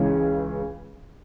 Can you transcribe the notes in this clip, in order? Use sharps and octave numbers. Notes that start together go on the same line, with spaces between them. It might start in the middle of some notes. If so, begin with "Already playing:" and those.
Already playing: C#2 C#3 E3 G#3 C#4